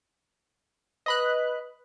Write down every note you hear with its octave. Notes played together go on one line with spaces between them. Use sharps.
B4 D#5 B5 F#6